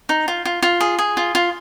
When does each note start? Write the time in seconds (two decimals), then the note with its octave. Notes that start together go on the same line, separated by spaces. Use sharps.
0.09 D#4
0.28 F4
0.45 F4
0.63 F4
0.81 G#4
0.99 G#4
1.17 F4
1.35 F4